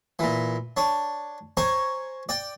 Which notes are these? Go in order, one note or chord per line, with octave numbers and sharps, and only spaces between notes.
A#2 E3
D4 C#5
C5 C#5 G#5 A#5 C#6
D5 G5